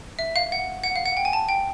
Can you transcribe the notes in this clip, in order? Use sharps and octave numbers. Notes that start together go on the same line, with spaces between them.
E5
F5
F#5
F#5
F5
F#5
G5
G#5
A5
G5